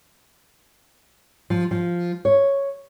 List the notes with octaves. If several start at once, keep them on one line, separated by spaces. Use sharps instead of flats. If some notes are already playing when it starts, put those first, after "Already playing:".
F3
F3
C#5